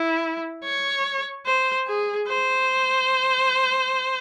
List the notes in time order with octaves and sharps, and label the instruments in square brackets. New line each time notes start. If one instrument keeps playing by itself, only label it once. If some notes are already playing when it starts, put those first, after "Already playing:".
Already playing: [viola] E4
C#5
C5
G#4
C5